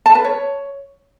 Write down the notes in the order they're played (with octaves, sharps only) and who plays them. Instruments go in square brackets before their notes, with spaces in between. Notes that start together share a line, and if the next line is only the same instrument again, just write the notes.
[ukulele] A5
B4
C#5